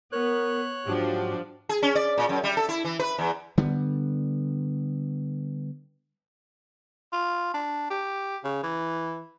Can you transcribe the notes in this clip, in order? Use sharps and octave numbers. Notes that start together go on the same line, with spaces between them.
B3 A#4 C#5 F#6
G#2 F3 F#3 D4 F#4 G4
G#4
C#4
D5
A#2
F#2
G3
A4
E4
E3
B4
E2
D3 G3 B3
F4
D4
G4
C#3
E3